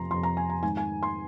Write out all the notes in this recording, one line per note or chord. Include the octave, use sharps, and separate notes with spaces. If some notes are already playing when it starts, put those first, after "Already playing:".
Already playing: F2 C3 F3 A#5 C6
F2 C3 F3 C6
A#5
G#5
A#5
G#2 D#3 G#5
G#5
C6